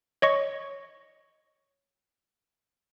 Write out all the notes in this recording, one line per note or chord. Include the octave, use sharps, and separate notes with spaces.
C#5 D#5 C#6